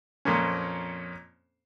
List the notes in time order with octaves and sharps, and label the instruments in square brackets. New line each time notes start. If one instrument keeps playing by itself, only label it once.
[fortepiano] F2 A#2 A#3 C4 C#4